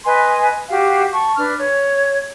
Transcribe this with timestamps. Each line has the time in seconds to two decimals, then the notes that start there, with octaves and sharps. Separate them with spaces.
0.04 B4 D#5 G#5 C6
0.69 F#4 G4 F5
1.13 A5 C#6
1.36 D4 B4 F6
1.57 C#5